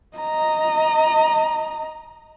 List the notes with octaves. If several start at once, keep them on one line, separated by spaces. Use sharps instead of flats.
D#5 A#5